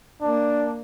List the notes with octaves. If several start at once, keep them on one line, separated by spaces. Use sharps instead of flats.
A#3 D4